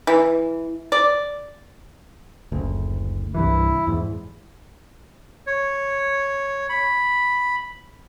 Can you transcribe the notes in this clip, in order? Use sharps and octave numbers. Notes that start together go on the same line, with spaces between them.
E3
D5
F#1 D2
C2 G2 E3 E4
E2 G#2
C#5
B5